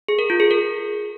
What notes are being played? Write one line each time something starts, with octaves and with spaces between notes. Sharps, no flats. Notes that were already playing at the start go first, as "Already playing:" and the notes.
G#4
A#4
F4
G#4
A#4